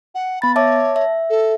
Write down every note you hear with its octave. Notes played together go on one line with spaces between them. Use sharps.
F#5
B3 B5 A6
C#5 E5 A5 D6
A5
E5
A4